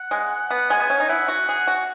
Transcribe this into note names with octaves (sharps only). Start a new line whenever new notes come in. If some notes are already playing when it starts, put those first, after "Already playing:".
Already playing: F#5
G#3
B3
G#3 G#5
B3
C#4
D#4
E4 F#5
F#4
G#4
F#4